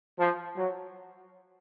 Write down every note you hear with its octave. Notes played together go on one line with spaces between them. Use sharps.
F3
F#3